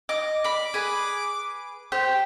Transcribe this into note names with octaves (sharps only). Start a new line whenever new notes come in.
D#5 D6
D5 B5 D6
G#4 B4
G4 C5 G5